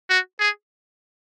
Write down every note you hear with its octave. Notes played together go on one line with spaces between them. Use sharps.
F#4
G#4